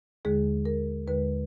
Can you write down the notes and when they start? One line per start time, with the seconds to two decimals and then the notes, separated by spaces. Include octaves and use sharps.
0.25 D#2 D3 G#3 G#4
0.65 A#4
1.07 D#2 D3 G#3 B4